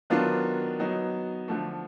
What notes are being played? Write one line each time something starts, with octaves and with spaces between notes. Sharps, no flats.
D#3 F#3 B3 D4 F4
F#3 B3 D#4
D3 F3 A3